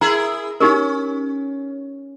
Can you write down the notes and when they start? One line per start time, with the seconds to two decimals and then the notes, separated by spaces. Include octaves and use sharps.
0.01 E4 G#4 A#4 A#5
0.60 C#4 D#4 G4 A#4